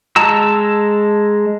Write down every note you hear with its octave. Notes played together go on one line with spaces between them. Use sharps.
G#3 A5 A#5 E6